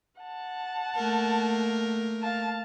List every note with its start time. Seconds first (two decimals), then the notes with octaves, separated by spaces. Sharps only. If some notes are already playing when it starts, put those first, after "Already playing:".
0.21 F#5 A5
0.96 A3 A#3 A#4
2.22 F5 A5